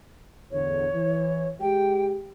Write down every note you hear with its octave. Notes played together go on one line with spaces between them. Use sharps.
E2 A2 D3 C#5
E3
G#3 G4 G5